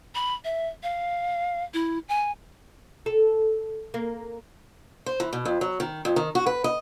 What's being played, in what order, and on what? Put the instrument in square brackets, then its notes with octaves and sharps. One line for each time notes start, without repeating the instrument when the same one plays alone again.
[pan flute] B5
E5
F5
E4
G#5
[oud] A4
A#3
[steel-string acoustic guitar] C5
E3
B2
F2
F#3
D#3
F2
D#3
F#4
B4
D#5